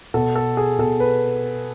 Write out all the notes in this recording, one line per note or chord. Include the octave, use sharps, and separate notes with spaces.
B2 A4
A4
G#4
B2 A4
B4